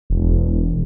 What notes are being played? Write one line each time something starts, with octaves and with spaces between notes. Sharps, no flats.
E1